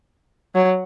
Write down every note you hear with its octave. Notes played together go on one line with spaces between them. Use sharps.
F#3